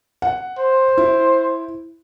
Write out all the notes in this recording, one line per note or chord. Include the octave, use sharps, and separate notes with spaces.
F#5
C5
E4